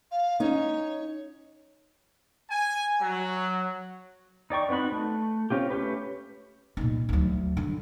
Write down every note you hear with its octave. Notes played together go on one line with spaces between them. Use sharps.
F5
C#4 D#4 C#5
G#5
F#3
D#4 D5 G5 C#6
B3 C4 D#4 F#4 B5
A3
C4 C#4 F4 G4
A3 C#4 G4 B4
A#2 D#4
D2 F#3
D3